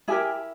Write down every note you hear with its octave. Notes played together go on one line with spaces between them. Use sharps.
E4 G4 G#4 A#4 G#5